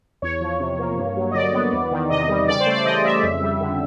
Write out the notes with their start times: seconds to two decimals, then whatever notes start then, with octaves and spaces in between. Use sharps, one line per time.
0.22 E2 C#5
0.41 F3
0.60 C3
0.79 A#3
0.98 G2
1.17 F#3
1.31 D#5
1.35 D3 D5
1.53 B3
1.72 E2
1.91 D#3
2.10 C3 D#5
2.29 G3
2.48 C#3 D5
2.60 C5
2.66 A3
2.73 D5
2.85 E3 D#5
3.05 C#3 E5
3.23 F2
3.41 G3
3.60 D3